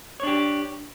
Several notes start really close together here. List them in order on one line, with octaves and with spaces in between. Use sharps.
C#5 D4 G4